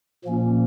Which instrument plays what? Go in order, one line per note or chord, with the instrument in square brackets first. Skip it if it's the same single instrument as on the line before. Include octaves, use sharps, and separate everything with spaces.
[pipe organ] A#2 F3 A#3 C#4